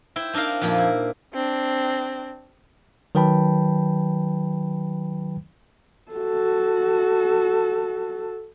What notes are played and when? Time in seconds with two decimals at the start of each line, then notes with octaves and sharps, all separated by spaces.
0.16 E4 C5 G5
0.33 C4 D4 D#4 A#4 F5
0.61 F2 A#2 F3 A#3
0.78 E4
1.34 C4 D4
3.15 D#3 F#3 B4 G5 A5 B5
6.11 F#4 A4